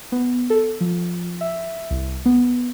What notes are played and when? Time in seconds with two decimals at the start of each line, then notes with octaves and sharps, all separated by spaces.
0.12 B3
0.50 A4
0.81 F3
1.41 E5
1.91 C2
2.25 B3